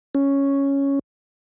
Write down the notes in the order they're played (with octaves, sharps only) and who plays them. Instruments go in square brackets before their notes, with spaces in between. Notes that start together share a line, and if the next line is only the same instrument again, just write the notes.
[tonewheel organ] C#4